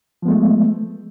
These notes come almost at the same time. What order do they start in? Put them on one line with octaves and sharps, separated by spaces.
F3 B3 G#3 A3